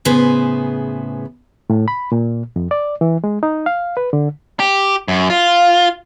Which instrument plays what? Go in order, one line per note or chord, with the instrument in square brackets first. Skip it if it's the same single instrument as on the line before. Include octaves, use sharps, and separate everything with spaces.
[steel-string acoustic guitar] A2 C#3 B3 G#4 B4 C5
[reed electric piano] A2
B5
A#2
F2
D5
E3
G#3
D#4
F5
B4
D3
[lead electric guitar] G4
F#2
F4